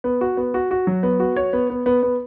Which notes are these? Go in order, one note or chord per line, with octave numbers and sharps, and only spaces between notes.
B3
F#4
B3
F#4
F#4
F#3
B3
F#4
C#5
B3
B3
B3
B3